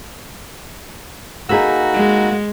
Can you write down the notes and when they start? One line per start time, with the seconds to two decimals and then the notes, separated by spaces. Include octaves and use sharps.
1.49 A#3 D#4 F#4 G#4 B5 E6
1.94 G#3